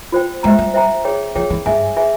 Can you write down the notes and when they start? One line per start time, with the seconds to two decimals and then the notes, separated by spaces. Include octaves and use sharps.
0.12 F4 C5 G5
0.43 G#3 C5 E5 G5 A#5
0.59 G3
0.74 C5 E5 G5 A#5
1.05 G#4 C#5 G5
1.35 F3 G#4 C#5 G5
1.50 E3
1.66 G2 G#4 E5 G#5
1.97 G#4 E5 G#5